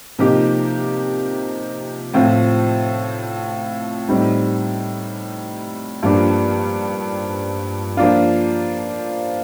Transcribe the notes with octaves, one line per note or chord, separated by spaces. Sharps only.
C3 F3 A#3 D#4 G4
A2 F3 C4 F4
A2 G3 C4 D#4
G2 F3 A#3 D4 G4
F3 A#3 D4 F4